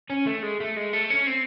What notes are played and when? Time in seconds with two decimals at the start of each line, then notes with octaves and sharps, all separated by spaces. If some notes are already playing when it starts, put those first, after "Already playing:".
0.10 C#4
0.26 A3
0.43 G#3
0.60 A3
0.77 G#3
0.93 A3
1.10 C#4
1.27 C4